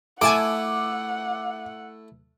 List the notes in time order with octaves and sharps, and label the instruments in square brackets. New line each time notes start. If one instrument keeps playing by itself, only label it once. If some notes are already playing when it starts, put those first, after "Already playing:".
[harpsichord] A3 E4 [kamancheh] F#5 [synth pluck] G#5 A5 D7 [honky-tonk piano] D6